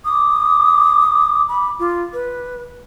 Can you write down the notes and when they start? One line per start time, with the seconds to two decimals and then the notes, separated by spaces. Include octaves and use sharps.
0.05 D6 D#6
1.48 B5
1.79 F4
2.13 B4